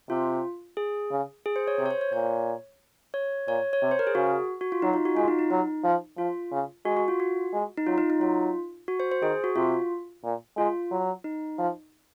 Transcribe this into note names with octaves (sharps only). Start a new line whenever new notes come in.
C3 F4
G#4
C#3
G#4
C5
C#5
C3 C5
C#5
C5
C#5
A#2 C#5
C#5
A#2 C#5
C#5
C3
C5
A#4
G#4
C#3 F#4
F#4
F4
F#3 D#4
F4
F#4
G#3 F4
D#4
D#4
F#3 D#4
F3
F3 F4
C#3
G#3 F#4
F#4
F4
F#4
G#3
D#4
F#3 F4
D#4
D#4
F#3 F4
F#4
C5
C5
D#3 G#4
F#4
C3 F4
A#2
G#3 F4
F#3
D#4
F3